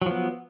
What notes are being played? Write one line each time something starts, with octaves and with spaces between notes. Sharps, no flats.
F3 F#3 B3